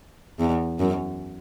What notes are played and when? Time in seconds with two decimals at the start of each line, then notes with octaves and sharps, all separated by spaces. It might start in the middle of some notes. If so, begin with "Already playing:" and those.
0.40 E2
0.79 F#2